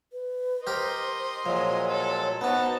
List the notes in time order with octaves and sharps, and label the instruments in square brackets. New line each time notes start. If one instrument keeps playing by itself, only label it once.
[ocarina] B4
[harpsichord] G4 A#4 [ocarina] C5 [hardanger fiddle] D#5 C6
[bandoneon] A#2 F#3 G#3 [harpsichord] F3 [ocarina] C#5
[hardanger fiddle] A4
[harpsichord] B3 F#4 [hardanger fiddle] D#4 A5 [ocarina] C5